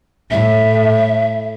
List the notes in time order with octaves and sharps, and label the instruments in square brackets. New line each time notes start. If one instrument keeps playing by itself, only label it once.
[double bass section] A2 [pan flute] E5